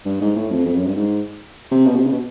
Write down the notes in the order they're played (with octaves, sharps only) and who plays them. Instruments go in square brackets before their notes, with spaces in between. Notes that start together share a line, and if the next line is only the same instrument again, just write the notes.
[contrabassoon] G2
G#2
A2
F2
F2
F#2
G2
G#2
C3
B2
C3
C#3
B2